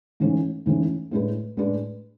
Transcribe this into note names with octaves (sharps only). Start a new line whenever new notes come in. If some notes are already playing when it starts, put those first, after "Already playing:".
G#2 E3 A3 C#4
G#2 E3 A3 C#4
A2 G#3 D4 G#4 B4
A2 G#3 D4 G#4 B4